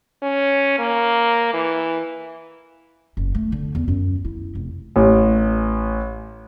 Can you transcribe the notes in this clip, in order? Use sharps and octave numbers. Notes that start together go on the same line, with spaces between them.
C#4
A#3
E3
F#1
A3
D3
E2
F#2
E4
F1
A1